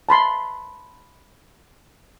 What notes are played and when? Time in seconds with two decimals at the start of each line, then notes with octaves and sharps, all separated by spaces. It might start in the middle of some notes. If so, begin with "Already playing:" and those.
0.09 A5 B5 C6